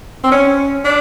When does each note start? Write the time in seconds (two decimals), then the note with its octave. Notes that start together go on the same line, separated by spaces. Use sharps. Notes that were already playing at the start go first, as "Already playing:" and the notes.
0.24 C4
0.32 C#4
0.85 D4